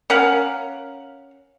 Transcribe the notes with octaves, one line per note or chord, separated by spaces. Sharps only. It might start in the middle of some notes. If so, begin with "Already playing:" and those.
C#4 A#4 F5 F#5